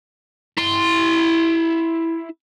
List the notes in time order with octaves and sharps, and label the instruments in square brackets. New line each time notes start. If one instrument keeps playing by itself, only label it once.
[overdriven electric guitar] E4 C6